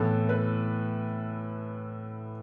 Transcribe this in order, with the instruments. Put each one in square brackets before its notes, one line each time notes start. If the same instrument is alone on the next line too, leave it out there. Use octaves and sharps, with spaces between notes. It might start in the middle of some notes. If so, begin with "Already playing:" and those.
Already playing: [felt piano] A2 E3 B3 A4
B4